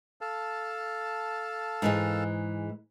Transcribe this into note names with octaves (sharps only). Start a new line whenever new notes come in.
A4 F5 A5
G#2 E3 G#3